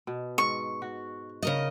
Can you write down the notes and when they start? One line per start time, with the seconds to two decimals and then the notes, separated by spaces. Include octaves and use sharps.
0.07 B2
0.38 G#2 C#6
0.82 F#4
1.43 C#3 A#4 D#5